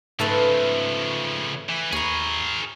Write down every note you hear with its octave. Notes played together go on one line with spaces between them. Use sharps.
G#2 C#3 F3 A3 A4 B4
E3
D#2 G#4 A#4 C#5 B5